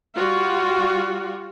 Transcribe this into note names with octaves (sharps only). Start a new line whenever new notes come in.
G3 F4 F#4